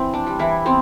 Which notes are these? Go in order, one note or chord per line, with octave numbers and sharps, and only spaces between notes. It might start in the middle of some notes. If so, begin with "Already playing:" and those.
Already playing: E3 C4
D4
G3
E3 E4
B3 C4 C5